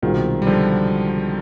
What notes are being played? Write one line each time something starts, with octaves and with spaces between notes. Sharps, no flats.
C2 B2 D#3 G#3 C4 F4
G3
D3 F3